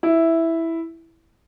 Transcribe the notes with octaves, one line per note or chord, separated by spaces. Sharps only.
E4 E5